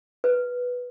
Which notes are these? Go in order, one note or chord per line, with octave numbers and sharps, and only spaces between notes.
B4